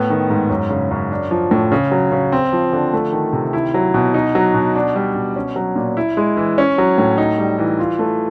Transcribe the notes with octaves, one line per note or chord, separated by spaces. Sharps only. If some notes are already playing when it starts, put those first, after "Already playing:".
Already playing: A2 B3
D#3
G#2
F#2
C#3
F#2
D4
F3
A2
C#3
F#3
C#3
C4
F3
D3
A3
D#3
C3
E4
F#3
B2
D#4
F#3
B2
D4
G3
B2
C#4
F#3
A#2
E4
G#3
E3
C#4
F#3
A2
D#4
G3
E3
F4
A3